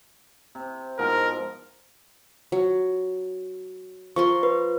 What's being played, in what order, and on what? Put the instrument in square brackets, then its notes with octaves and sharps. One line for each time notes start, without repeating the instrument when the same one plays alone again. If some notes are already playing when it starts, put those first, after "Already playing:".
[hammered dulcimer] C3
[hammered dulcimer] G#2 B2 F3 [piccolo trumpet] A#4
[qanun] F#3
[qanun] F3 A#4 C6 [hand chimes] C#6
[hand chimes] B4